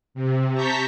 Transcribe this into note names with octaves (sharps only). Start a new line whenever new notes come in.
C3
A5 A#5 C#6 G6 B6